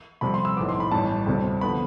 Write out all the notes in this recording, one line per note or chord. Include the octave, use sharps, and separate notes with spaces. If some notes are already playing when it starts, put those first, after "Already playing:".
F2 C3 G3 B5
C6
E6
B1 A2 F3 B3 D6
C6
B5
A1 G2 E3 G3 A5
D2 C3 G3 C4
D3 F3 B3 B5